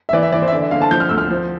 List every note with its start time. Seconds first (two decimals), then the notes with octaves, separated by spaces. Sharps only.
0.09 E5
0.13 E3 D5
0.23 E5
0.32 E3 D5
0.42 C5
0.48 E5
0.52 D3 D5
0.62 E5
0.71 D3 F5
0.81 A5
0.91 F3 G6
1.00 F6
1.09 D2 E6
1.18 F6
1.30 F3